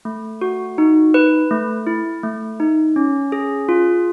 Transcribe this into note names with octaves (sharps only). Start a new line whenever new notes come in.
A3
F#4
D#4
B4
A3
E4
A3
D#4
C#4
G#4
F4